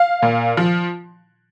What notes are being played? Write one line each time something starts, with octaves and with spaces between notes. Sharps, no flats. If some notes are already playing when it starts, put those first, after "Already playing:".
Already playing: F5
A#2
F3